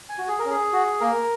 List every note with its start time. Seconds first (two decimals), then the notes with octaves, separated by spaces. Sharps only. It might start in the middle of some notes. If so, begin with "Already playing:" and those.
0.09 G#5
0.19 F#4
0.28 G#4
0.40 A#4
0.46 C#4
0.51 G#4
0.73 F#4
1.01 A#3 A#4